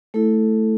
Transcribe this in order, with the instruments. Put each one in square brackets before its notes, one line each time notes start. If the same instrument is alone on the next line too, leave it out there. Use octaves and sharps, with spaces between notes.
[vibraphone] A3 E4 A4